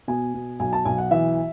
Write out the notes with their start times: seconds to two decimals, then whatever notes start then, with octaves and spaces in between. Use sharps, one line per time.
0.08 B2 G#5
0.34 B2
0.59 B1 G#5
0.73 A5
0.85 B1 G#5
0.98 F#5
1.11 E3 E5